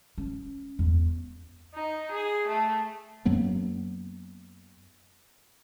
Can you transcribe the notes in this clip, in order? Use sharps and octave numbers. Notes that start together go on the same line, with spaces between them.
C#4
E2
D#4
G#4
A3
F#2 F#3 A#3 B3